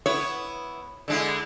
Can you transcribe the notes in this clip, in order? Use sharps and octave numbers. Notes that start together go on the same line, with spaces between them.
B3 E4 C#5
D3 G#3 E4